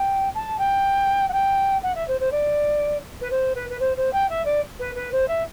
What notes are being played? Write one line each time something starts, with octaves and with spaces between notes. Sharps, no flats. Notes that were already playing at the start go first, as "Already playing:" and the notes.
Already playing: G5
A5
G5
F#5
G5
F#5
E5
C5
C5
D5
B4
C5
B4
B4
C5
C5
G5
E5
D5
B4
B4
C5
E5